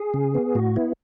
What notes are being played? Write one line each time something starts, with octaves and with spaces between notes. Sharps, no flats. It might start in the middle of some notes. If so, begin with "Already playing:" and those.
Already playing: G#4
C#3
B3
A2 F#4
B3 E4